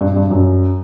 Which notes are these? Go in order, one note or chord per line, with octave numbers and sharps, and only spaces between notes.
G2
G2
F#2